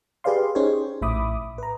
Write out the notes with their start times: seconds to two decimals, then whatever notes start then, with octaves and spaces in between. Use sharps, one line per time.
0.24 G4 G#4 B4 D5 F5 C6
0.55 C#4 D#4 G4 G#4 C5 C#5
1.02 A#1 A2 E5 B5 D6 D#6
1.58 B4 A#5